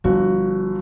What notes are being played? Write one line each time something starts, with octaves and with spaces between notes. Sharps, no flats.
G1 F3 F#4